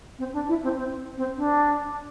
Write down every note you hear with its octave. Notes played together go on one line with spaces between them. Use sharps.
C4
D4
E4
C4
C4
C4
D4